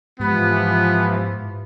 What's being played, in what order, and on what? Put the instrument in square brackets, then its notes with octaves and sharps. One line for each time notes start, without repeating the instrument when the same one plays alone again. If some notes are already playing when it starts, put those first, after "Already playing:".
[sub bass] G#2 [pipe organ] E3 F3 [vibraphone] G#3 G4 B5 [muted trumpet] B3